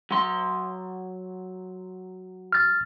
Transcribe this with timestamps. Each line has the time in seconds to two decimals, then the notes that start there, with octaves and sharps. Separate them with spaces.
0.11 F#3 C6
2.52 F6 A6